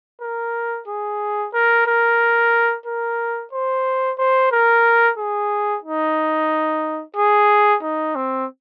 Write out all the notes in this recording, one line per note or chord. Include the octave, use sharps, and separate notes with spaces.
A#4
G#4
A#4
A#4
A#4
C5
C5
A#4
G#4
D#4
G#4
D#4
C4